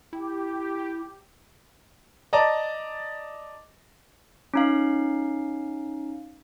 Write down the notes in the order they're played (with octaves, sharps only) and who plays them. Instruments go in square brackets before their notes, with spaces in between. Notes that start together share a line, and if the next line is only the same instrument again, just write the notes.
[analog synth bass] E4 [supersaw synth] G4
[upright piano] D5 D#5 A5 A#5
[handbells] C#4 D#4 F5